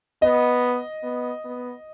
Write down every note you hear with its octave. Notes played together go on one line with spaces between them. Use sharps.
B3 D#5
B3
B3